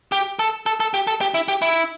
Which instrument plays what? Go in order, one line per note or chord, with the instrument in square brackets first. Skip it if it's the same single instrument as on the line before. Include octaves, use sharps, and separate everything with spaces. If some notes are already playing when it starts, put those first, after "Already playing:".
[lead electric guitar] G4
A4
A4
A4
G4
A4
G4
E4
G4
E4